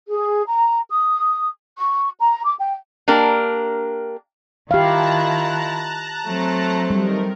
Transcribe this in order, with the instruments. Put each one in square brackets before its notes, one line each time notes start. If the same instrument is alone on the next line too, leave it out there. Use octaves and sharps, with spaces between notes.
[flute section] G#4
A#5
D#6
C#6
A#5
D6
G5
[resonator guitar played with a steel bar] A#3 D4 G4 A#4
[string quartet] D#3 E4 F4 [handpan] G4 F5 [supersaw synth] A5 A#5 F#6
[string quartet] F#3 A3 C4
[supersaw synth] D#3 A#4 [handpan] G3